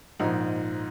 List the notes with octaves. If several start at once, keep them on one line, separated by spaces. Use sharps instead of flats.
A#1 G#2 F3 D#4